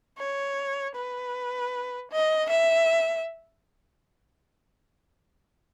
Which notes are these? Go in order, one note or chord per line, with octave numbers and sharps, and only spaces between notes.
C#5
B4
D#5
E5